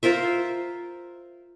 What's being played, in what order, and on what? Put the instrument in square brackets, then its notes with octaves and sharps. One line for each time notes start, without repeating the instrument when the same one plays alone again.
[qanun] F4 A#4 C5 E5